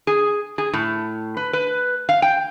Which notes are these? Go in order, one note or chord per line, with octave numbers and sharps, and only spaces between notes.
G#4
G#4
A2
B4
B4
F5
G5